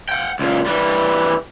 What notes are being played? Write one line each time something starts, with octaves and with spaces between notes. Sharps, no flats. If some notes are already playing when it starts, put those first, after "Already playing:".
F#5 G5
C#2 A#2
E3 G3